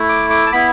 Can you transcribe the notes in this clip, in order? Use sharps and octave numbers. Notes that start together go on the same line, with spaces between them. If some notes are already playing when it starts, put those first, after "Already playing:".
Already playing: A3 E4
D6
D6
A5
B3 E4 B5